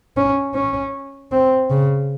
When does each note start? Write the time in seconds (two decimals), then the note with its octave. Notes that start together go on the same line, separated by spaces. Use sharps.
0.17 C#4
0.55 C#4
1.31 C4
1.70 C#3